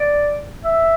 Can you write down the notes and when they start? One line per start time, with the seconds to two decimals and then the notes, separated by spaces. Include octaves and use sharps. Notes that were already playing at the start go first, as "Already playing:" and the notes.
Already playing: D5
0.64 E5